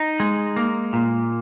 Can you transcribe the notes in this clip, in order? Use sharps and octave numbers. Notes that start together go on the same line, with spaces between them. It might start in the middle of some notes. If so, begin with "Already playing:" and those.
Already playing: D#4
G#3
A#3
A#2